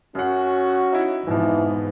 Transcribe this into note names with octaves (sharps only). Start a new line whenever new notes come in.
F#2 C#4 F#4 F#5
D#4 E4
F2 G#2 B2 E3 F3